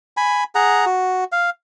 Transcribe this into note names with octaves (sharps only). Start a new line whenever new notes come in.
G#5 B5
G#4 F#5 A#5
F#4
F5